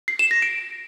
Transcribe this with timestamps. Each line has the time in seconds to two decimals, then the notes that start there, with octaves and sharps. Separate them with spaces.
0.08 C7
0.19 E7
0.31 A#6
0.42 D7